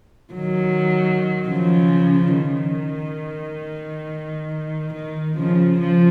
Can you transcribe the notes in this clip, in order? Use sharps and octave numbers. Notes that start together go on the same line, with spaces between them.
D#3 F#3
C#3 F3
D#3
D#3
C#3 F3
F3